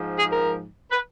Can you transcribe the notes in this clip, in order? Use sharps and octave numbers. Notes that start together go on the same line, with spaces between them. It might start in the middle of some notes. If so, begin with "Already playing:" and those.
Already playing: G#2 F3
G#4
A#4
B4